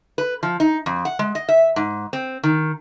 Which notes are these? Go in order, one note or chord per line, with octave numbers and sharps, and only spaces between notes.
B4
F3
D#4
F2
F#5
G#3
D#5
E5
G#2
C4
D#3